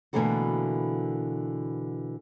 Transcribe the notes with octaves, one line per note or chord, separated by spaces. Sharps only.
B2 D3 E3 A3 A#3 F#4